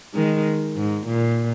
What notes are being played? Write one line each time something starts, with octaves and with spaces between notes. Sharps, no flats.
D#3 G#3
G#2
A#2